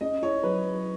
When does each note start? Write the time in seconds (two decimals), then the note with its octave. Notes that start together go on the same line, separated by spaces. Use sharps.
0.01 C#4 D#5
0.22 E4 C#5
0.43 F#3 B4